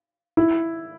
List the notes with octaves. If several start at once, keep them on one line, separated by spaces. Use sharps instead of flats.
E4